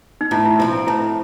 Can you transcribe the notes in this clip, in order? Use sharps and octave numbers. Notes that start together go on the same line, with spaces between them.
D#4
A2 E4
E4
F3 A3 C4 E4
A2 E4